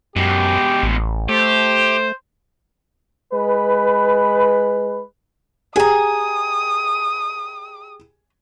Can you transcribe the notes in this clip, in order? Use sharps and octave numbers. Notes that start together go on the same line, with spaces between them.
F#2 B2 G#3 G4
A1
A3 G4 C5
G#3 B4
G4 G#4 G#5 A#5 D#6